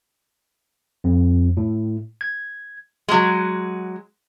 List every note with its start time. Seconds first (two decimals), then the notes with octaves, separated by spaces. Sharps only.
1.04 F2
1.57 A2
2.21 G#6
3.08 F#3 G#3